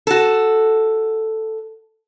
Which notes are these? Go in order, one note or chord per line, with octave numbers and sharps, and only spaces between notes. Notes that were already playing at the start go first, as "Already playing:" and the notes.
F#4 A4